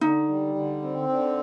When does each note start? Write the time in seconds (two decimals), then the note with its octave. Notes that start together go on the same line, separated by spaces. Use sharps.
0.01 D3 D#4
0.29 G3
0.55 D3
0.82 C4
1.09 D3